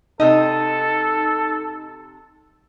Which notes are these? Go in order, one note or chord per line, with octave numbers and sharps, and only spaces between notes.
C3 D#4 A4 D#5